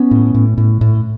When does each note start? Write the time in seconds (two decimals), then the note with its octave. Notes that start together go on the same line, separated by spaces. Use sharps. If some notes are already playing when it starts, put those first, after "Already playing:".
Already playing: B3 C#4
0.11 A2
0.34 A2
0.58 A2
0.81 A2